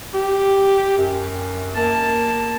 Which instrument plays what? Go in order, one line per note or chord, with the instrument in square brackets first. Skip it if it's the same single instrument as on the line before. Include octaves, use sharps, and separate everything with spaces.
[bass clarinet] G4
F#2
[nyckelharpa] A#3 A5